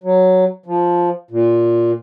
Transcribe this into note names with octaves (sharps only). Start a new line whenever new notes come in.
F#3
F3
A#2